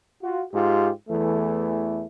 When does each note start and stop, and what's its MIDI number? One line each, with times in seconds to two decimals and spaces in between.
0.22 0.44 65
0.22 0.44 66
0.53 0.90 44
0.53 0.90 65
0.53 0.90 67
1.09 2.06 40
1.09 2.06 52
1.09 2.06 57